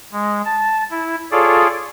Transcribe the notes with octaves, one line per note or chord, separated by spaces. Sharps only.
G#3
A5
E4
F4 G#4 A4 C#5 D5